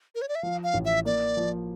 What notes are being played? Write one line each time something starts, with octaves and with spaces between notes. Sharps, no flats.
A#4
C#5
D5
E5
F3 F5
F5
A1
E5
A#3 D5
F3